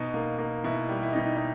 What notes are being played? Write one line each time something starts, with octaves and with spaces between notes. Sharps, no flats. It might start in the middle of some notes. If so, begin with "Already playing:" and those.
Already playing: B2 D#4
A#3
A#3
B2 E4
G3
E4
B2 D#4
D#4